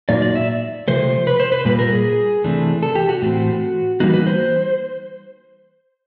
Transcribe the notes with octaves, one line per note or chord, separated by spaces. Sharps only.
A#2 F#3 A#3 D#4 D5
D5
E5
C3 F3 A3 C5
B4
C5
B4
A#2 G3 A#3 B4
A#4
G#4
C3 E3 A3 D4
A4
G4
F#4
A2 E3 A3 C4
E3 G3 A#3 D#4 F#4
B4
C5